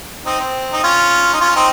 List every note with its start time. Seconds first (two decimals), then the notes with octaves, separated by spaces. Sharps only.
0.26 C4 D#4
0.39 C4
0.73 D#4
0.83 C#4 F4
1.33 D#4
1.41 C#4 F4
1.56 C4 D#4